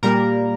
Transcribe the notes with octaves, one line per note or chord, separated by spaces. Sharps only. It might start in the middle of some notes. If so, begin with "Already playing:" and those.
A#2 G3 A#3 A#4 A#5